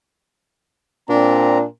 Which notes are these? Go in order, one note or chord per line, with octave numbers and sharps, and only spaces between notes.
A#2 C4 D4 A#5